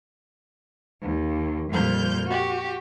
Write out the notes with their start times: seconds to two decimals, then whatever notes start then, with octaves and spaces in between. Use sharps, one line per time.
1.01 D#2
1.70 F2 A#2 G3 F6 G6
2.25 F#4 G4